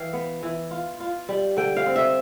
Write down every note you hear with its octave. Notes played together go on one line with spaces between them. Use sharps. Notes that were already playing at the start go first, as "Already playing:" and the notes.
Already playing: E3 F5 G5
B3
E3
F4
F4
G3
D3 G5
F5
C4
E5